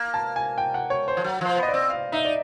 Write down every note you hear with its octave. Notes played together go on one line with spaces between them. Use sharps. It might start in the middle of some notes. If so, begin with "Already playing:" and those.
Already playing: A#3
A5
G#5
G5
F#5
C#5
C5
F3
F#3
F3 C5
B3
D#5
D5
C4
F5
D#4 E5
D5